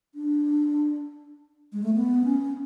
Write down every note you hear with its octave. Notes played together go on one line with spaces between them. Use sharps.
D4
G#3
A3
B3
C#4